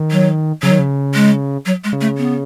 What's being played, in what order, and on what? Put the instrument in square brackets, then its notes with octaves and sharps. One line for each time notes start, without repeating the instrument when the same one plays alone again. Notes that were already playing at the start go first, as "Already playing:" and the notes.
Already playing: [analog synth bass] D#3
[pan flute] F#3
[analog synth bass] C#3 [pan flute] F#3
[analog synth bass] D#3
C#3
[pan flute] G#3
F#3
G#3
[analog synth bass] C#3
[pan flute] A3
B3